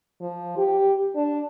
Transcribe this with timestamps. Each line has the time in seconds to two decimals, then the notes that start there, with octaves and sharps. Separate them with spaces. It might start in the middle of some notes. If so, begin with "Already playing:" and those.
0.21 F3
0.57 G4
1.16 D4